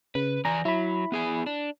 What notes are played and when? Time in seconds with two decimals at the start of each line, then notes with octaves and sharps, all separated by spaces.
0.15 C#3 B4
0.45 E3 D5 G#5 A#5
0.65 F#3 E4 B5
1.12 B3 G#4 G#5
1.46 D4